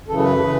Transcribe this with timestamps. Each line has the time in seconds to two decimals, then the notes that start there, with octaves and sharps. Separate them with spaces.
0.08 F#2 C#3 E3 A4
0.19 A4
0.24 B4
0.41 C#3 E3